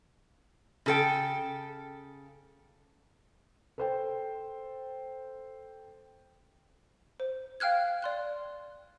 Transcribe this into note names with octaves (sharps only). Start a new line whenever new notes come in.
C#3 A4 G5
A4 C5 G5
C5
F5 G5 F6 F#6 G#6
D5 C6 F#6